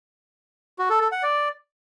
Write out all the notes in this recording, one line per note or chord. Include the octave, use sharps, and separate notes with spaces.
F#4
A4
A4
F#5
D5